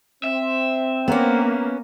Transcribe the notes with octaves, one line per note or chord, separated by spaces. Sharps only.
C4 E5
A#3 B3 C#4